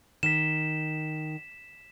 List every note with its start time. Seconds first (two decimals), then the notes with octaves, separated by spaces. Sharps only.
0.23 D#3 B6 E7